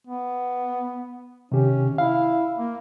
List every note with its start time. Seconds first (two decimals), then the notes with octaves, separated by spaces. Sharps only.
0.07 B3
1.52 C3 D#3 C#4 G4
1.98 E4 F5
2.58 A#3